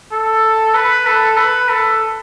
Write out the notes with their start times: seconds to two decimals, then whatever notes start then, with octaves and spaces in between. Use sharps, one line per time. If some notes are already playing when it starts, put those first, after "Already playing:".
0.12 A4
0.75 B4
1.07 A4
1.37 B4
1.69 A4